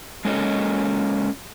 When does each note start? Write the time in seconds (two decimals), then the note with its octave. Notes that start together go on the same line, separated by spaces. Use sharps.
0.25 G#3 A#3 C#4 A4 D#5